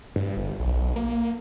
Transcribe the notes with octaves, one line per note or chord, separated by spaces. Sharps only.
G2
G1
B1
A#3